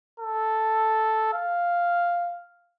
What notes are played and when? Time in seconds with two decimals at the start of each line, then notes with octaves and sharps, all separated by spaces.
0.20 A4
1.33 F5